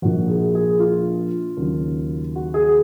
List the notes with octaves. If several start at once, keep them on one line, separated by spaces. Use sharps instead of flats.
A#1 A#2 F3 F#4
G#4
G#4
F4
D#2 C#3 F#3
F#4
G#4